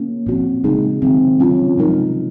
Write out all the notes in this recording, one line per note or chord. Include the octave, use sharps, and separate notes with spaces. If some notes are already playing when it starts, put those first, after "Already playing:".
Already playing: A#3 C#4
A#2 F3 C4 F#4
C#3 G#3 D#4 G#4
C3 D#3 F#3 C4
F#3 C#4 F4
C3 F3 G#3 D#4 A#4